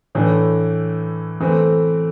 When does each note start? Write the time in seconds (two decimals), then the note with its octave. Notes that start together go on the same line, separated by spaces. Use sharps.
0.15 A2 E3 A3 D4
1.40 E3 A3 C4